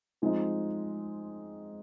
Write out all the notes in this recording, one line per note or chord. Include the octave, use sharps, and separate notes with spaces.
F3 G#3 C4 D#4